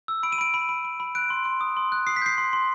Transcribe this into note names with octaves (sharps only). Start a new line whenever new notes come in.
E6
B5 D7
D#7
B5 D7
B5
B5
B5
B5
F#6 D7
C6
C6
D#6
C6
F#6
D#6 C7
B6
G6 C7
C6
C6